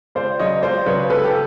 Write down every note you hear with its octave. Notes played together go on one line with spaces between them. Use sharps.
C#2 C5 D5
C#3 F#3 C#5 D#5
C#2 C5 D5
C#3 F#3 B4 C#5
C#2 A4 B4
G4 A4